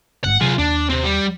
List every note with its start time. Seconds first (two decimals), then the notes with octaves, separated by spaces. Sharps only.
0.24 G#1 G2 F#5
0.41 C3 F#3 F4 G#4
0.58 D#2 D4
0.89 C3 C4
1.03 G3